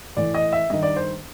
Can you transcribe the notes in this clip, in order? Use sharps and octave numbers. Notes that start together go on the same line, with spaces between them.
A2 E3 D5
D#5
E5
G2 D#3 D#5
D5
C5